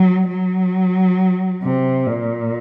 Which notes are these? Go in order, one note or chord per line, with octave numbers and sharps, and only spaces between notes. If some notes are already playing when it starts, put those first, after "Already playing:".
Already playing: F#3
F#3
C3
A#2